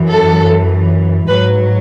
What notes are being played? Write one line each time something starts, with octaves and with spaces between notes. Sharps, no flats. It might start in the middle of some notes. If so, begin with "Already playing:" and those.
Already playing: F#2 E3
A4
G#2 F#3 B4